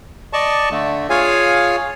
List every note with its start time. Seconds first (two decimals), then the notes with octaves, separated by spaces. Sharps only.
0.33 D5 D#5 A5 C#6
0.71 D3 A3
1.10 F4 G#4 C#5 F5 G#5